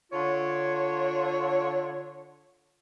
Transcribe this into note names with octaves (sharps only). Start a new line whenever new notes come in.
D3 F4 C#5